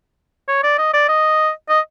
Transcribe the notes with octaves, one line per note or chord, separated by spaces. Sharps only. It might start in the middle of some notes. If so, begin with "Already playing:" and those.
C#5
D5
D#5
D5
D#5
D#5